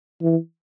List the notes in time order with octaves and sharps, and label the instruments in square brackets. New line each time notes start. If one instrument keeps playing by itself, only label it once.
[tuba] E3